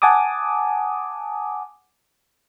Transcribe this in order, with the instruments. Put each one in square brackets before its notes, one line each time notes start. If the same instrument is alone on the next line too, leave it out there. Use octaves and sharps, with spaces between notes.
[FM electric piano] F#5 G#5 A5 D6 D#6